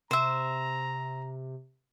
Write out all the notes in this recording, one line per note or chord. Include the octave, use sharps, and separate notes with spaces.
C3 C5 E5 A#5